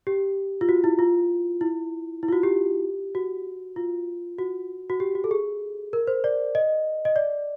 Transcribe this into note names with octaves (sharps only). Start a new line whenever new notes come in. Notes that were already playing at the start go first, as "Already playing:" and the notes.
G4
F4
F#4
E4
F4
E4
E4
F4
F#4
G4
F#4
F4
F#4
F#4
G4
F#4
A4
G#4
A#4
C5
D5
D#5
D#5
D5